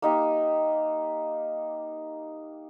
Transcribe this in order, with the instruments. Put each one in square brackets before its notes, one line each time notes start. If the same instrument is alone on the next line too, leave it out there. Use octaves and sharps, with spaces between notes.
[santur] A#3 D#4 G4